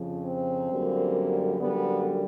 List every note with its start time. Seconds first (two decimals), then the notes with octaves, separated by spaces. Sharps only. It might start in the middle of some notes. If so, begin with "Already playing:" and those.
Already playing: F2 C#3 F3
0.25 C4
0.69 F#2 D3 G3 A#3
1.59 F#2 D3 G3 A#3 B3